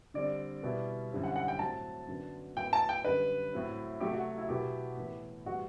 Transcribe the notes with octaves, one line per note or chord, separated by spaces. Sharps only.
D3 G3 C4 D5
B2 G3 B3 E4
F#2 D3 G3 C4 E4
F#5
F#5
G5
A2 F#3 C4 A5
F#2 D3 F#3 B3 D4
A2 F#3 B3 G5
A5
G5
F#2 D3 G3 B4
A2 F#3 C4 E4
C3 F#3 A3 G4
F#4
E4
B2 F#3 B3 E4 G4
A2 E3 B3
A2 E3 G3 F#4